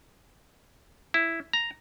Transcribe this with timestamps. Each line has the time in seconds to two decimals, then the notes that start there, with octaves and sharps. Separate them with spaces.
1.14 E4
1.53 A#5